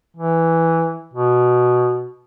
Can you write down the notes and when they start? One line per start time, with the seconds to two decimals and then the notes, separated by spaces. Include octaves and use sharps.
0.17 E3
1.14 B2